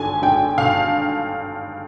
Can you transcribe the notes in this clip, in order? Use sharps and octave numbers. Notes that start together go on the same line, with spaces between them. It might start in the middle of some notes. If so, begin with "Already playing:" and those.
Already playing: G#1 G2 D3 G#5
G#1 G5
G2 D3 F5